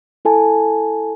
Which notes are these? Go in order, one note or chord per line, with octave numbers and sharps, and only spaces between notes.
E4 A4 G#5 A5